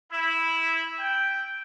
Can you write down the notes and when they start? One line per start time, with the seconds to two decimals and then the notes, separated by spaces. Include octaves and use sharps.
0.13 E4
0.99 G5